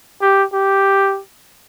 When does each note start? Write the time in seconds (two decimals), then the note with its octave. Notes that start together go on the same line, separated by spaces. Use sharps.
0.22 G4
0.53 G4